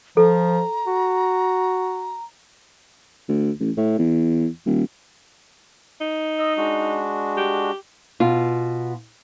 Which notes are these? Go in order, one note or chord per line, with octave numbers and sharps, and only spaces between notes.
F3 A4 A#5
F#4
D2
A1
A2
E2
D#1
D#4
D#5 E6
G#3 D4 F#4
G4
B2 F4